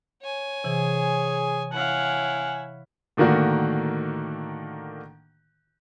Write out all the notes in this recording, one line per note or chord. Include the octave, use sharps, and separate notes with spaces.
C#5 G#5
C3 E3 G#4
E4 C#5 F5 F#5 G#5
A2 D3 D#3 A#3 F#4